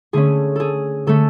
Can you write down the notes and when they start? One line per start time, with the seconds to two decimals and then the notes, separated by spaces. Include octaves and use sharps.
0.13 D3 A3 C#4 G#4
0.56 G#4 A4
1.07 D3 A3 C#4 A4